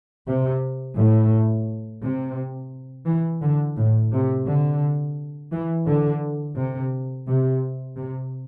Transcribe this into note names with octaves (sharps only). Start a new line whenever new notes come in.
C3
A2
C3
E3
D3
A2
C3
D3
E3
D3
C3
C3
C3